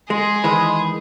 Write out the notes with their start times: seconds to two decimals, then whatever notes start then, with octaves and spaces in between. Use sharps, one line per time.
0.10 G#3 G#4 C6
0.44 D#3 E3 G#3 B5 C6 D#6